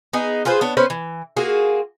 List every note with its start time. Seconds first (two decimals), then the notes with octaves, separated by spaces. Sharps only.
0.13 B3 D#4 G#4
0.45 F4 G#4 B4 C5
0.61 B3 D4 C#5
0.77 B3 C#4 B4 C5
0.90 E3
1.37 A#3 F4 F#4 G#4